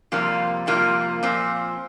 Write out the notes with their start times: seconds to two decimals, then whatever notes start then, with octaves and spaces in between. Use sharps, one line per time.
0.12 F2 C3 G3 A#3 F4
0.67 F2 C3 G3 A#3 F4
1.23 A#2 F3 C4